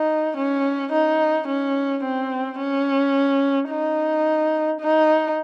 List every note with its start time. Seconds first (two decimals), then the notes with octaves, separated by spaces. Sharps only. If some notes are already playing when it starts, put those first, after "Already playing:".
Already playing: D#4
0.38 C#4
0.93 D#4
1.48 C#4
2.04 C4
2.59 C#4
3.70 D#4
4.81 D#4